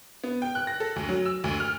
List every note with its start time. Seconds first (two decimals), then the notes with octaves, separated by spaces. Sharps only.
0.24 B3
0.42 G5
0.55 F#6
0.67 A#6
0.80 A4
0.96 D2
1.09 F#3
1.25 E6
1.44 D2
1.60 F6